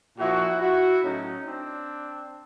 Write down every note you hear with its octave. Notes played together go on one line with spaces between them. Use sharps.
A#2 F3 E4 F#4
E4 F#4
A2 F#3 C#4 D#4
C4 D4